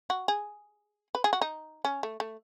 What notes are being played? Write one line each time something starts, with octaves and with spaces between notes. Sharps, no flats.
F#4
G#4
B4
G#4
F#4
D#4
C#4
A3
A3